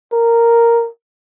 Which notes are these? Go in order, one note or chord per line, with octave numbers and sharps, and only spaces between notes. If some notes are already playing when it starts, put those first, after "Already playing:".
A#4